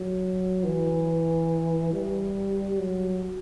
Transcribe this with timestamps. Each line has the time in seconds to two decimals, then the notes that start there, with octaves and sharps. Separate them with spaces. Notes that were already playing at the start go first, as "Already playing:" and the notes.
Already playing: F#3
0.64 E3
1.93 G3
2.78 F#3